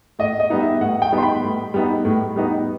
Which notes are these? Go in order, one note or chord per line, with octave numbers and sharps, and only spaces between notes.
A2 D#5
D#5
G3 B3 D#4
E5
A2 F#5
G5
G3 B3 D#4
C6
B5
A2
G3 B3 D#4
A2
G3 B3 D#4